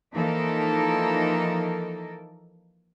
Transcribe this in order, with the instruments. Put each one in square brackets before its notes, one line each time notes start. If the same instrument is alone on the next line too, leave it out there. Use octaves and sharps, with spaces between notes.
[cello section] E3 F3 A#3 D#4 A4 A#4